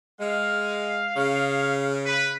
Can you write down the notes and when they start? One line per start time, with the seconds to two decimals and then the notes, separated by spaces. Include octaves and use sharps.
0.20 G#3 F5
1.17 C#3
2.06 B4